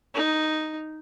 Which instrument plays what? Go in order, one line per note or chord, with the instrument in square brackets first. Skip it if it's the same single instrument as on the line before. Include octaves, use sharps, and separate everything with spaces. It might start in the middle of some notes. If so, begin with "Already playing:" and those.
[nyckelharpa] D#4